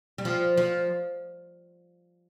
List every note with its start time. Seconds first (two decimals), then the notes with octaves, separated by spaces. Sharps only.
0.18 G3
0.25 F3
0.57 F3